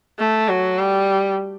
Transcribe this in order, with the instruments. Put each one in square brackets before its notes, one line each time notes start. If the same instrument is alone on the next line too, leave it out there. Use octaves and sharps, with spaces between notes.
[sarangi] A3
F#3
G3